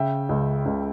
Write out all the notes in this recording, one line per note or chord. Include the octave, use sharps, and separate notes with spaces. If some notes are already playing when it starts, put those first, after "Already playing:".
Already playing: C#3 E5 G5
C#2
C#2